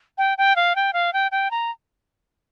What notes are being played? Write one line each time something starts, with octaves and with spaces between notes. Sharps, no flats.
G5
G5
F5
G5
F5
G5
G5
A#5